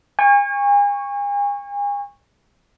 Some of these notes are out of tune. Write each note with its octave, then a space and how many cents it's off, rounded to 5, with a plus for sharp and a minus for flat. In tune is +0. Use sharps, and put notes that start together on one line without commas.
G#5 -40 C#6 -5